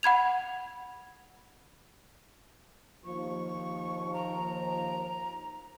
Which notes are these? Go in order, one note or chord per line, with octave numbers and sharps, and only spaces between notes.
F#5 B5 G#6 F7
D#2 F3 C#6
A#5